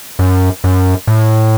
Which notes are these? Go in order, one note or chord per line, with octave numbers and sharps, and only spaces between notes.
F#2
F#2
A2